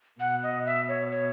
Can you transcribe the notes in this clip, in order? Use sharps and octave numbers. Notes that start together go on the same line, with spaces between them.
B2 F#5
D#5
E5
C#5
C#5